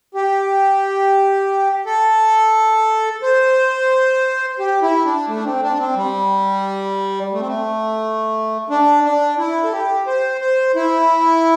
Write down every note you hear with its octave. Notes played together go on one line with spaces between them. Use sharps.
G4
A4
C5
G4
E4
D4
A3
D4
C4
D4
C4
G3
A3
C4
A3
D4
D4
E4
A4
G4
C5
C5
E4